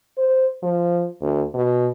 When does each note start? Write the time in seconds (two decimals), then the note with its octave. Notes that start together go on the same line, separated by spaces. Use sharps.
0.18 C5
0.63 F3
1.22 D2
1.54 B2